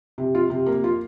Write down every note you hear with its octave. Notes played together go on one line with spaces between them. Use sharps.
C3
F4
C3
A#3
F4